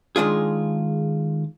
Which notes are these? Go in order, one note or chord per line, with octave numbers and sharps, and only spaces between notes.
D#3 G#3 D4 F4 G#4